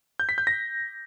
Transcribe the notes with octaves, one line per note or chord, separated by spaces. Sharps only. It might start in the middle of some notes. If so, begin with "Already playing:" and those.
G6
B6
G6
A#6